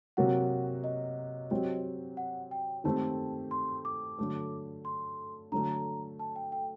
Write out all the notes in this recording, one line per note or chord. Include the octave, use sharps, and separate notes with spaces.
C3 F#3 A#3 F#4 F#5
D#5
F#3 C4 G4
F#5
G5
D#3 A3 C4 G4 A5
C6
D6
D3 F#3 A3
C6
D3 F#3 A3 A#5
A5
G5
G5